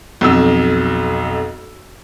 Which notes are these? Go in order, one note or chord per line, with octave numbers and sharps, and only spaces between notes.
B1 F2 E6